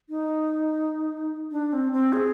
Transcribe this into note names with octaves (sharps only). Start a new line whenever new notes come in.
D#4
D4
C4
C4
G#4